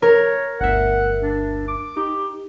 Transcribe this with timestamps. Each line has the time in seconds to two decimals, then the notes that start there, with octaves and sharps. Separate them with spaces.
0.02 A#4 C#5
0.60 G1 D2 E5 F#5
1.21 D4
1.68 D6
1.97 D#4 G4